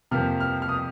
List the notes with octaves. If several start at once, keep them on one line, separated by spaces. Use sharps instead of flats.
F2 C3 F3 A#3 F6
F6
F6
D#6